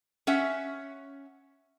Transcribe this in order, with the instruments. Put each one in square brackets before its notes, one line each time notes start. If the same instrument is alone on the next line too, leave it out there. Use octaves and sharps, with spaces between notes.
[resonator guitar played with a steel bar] C#4 E5 F#5